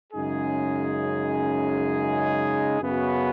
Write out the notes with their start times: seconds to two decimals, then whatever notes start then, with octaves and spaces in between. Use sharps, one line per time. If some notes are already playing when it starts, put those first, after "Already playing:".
0.13 F#2 C#3 G#3 D#4 G#4
2.80 F#2 C#3 B3 F#4